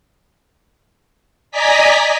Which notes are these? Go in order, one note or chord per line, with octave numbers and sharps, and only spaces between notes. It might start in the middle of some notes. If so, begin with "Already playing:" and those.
D5 D#5 G#5 A#5 B6